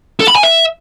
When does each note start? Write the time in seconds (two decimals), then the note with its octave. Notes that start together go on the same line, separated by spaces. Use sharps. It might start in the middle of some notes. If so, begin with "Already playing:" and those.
0.20 A4
0.28 B5
0.36 G#5
0.43 E5